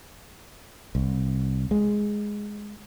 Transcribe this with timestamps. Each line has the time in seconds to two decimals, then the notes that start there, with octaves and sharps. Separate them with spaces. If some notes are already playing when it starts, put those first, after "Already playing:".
0.95 C2
1.71 G#3